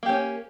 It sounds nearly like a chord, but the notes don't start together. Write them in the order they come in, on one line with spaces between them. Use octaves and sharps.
A#3 G4 C#4